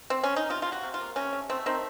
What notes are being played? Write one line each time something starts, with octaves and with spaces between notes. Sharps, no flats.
C4
C#4
D#4
C3 F4
C3 F4
F#4
C3
F4
A#3
C3 C#4
A3
A3 C4
D#3 C4